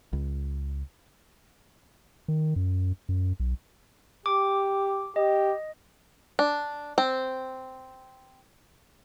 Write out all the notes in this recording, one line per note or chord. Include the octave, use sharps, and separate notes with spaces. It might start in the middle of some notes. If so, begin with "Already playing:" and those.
C#2
D#3
F#2
F#2
B1
G4 D6
G4 D#5
D4
C4